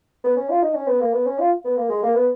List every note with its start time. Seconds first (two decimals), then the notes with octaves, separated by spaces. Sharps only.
0.24 B3
0.36 C#4
0.50 F4
0.62 D#4
0.74 C#4
0.87 B3
1.01 A#3
1.13 B3
1.26 C#4
1.39 F4
1.65 B3
1.77 A#3
1.89 G#3
2.03 A#3
2.15 B3